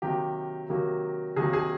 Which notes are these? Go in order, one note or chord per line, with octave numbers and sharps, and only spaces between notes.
C3 D#3 F#3 A#3 G4
C3 D#3 F#3 A#3
C3 D#3 F#3 A#3 G#4
G#4